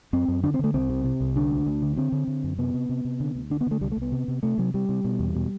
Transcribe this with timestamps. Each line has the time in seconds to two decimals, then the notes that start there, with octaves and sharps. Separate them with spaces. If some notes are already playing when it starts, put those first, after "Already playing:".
0.13 F#2 C4
0.28 F#2
0.43 D3 D4
0.54 C4
0.59 D3 A3
0.74 C2 C4
0.90 C3
1.04 C3
1.21 C2
1.36 D3 D4
1.51 D2
1.66 D2
1.82 D3
1.97 D3 C4
2.12 D3
2.27 D3
2.44 F#2
2.58 C3 B3
2.74 C3
2.89 C3
3.05 C3
3.20 D3
3.35 D2
3.50 D3 D4
3.61 B3
3.67 D3 A3
3.81 C2 G3
3.92 A3
3.97 C2 B3
4.12 C3
4.28 C3
4.43 C3 A3
4.58 C3 F#3
4.74 C3 G3
4.89 C3
5.04 B2
5.19 E2
5.35 B2